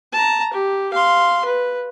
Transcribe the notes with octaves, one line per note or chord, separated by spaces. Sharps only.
A5 A#5
G4
F5 C6
B4